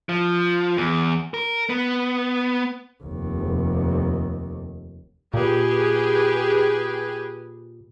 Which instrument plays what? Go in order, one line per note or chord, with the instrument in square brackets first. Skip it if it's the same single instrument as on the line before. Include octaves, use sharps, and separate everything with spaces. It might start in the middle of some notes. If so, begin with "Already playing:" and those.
[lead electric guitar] F3
E2
A#4
B3
[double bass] F1 D#2
[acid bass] A#2 [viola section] G4 G#4 B4